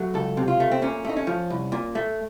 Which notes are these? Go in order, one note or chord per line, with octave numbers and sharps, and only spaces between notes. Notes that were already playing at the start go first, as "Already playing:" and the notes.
Already playing: F#3 A3
C#2 A4
C3
F4
A3
C4
A#2 C#4
A3 D#4
C#4
F3
C2
A#2
A3